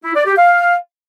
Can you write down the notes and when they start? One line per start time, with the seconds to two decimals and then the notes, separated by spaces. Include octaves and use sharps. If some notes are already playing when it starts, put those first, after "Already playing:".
0.04 E4
0.15 D5
0.26 G4
0.37 F5